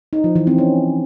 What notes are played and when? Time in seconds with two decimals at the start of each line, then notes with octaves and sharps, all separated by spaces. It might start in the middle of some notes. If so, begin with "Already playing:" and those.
0.13 D#4
0.24 F3
0.36 E3
0.47 C4
0.58 C#4